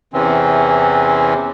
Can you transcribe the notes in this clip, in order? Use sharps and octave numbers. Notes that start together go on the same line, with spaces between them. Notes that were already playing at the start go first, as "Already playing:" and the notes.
E2 C3 E3 C4 C#4